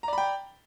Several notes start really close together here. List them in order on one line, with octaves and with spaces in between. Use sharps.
A#5 D5 B5 G5